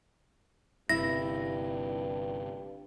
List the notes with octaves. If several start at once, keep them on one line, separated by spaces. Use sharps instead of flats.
G1 G2 C3 E4 A#6